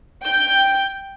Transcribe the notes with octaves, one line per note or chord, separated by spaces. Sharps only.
G5 G6